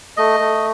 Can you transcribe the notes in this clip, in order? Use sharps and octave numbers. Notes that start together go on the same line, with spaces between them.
A3 D#5
A3